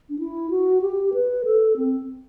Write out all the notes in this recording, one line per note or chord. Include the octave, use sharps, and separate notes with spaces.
D4
E4
F#4
G4
B4
A4
C4